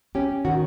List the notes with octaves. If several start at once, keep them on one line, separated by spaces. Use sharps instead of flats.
C#4 G4
D#3 F#4